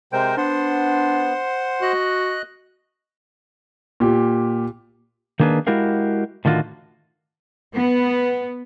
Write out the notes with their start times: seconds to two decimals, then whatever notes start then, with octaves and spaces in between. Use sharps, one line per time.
0.13 C3 G#3 A#4 C5 G5
0.37 B3 D4 C5 F#5 C6
1.82 F#4 D#5 F#6
4.00 A#2 G4
5.40 D#3 A#3 D4 G#4 B4
5.67 G#3 E4 F#4 G4 A#4 F5
6.45 A2 D3 D#3 F4 F#4
7.75 B3